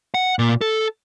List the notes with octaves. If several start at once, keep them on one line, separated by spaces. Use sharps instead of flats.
F#5
A#2
A4